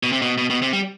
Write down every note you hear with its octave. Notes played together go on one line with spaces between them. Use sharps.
B2
C3
B2
B2
B2
C3
G3